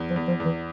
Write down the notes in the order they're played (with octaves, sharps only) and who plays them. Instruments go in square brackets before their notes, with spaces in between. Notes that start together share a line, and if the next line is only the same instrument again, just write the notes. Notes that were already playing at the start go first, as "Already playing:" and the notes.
Already playing: [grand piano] E2
[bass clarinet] F3
[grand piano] E2
[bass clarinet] F3
[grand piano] E2
[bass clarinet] E3